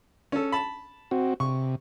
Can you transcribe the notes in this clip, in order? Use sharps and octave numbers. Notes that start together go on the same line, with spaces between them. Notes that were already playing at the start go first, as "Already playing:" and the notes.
C#4 A4
A5 B5
C4 F#4
C3 C#6